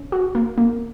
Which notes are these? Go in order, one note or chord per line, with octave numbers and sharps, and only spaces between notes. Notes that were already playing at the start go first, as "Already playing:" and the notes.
Already playing: C#4
F#4
A#3
A#3